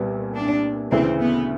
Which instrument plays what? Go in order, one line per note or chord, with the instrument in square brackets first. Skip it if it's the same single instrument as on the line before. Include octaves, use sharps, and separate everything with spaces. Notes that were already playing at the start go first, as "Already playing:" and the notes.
Already playing: [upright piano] C2 A#2 G3 B3
[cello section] D4
[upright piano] D2 C#3 E3 [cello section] C4
[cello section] B3